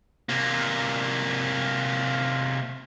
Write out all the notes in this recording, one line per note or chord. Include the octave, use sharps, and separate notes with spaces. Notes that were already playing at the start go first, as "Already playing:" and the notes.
C3 A#3